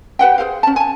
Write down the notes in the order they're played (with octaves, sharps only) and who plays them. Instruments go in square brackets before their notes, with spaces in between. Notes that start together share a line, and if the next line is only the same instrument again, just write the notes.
[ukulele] G4 B4 F#5 G5
G#4 A#4 C5 F5
C#4 A5
G#5 A5